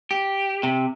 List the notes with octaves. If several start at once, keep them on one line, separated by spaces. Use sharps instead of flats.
G4
C3